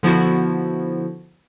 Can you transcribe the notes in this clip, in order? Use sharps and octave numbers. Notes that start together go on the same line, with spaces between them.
D3 F3 B3 E4 F#4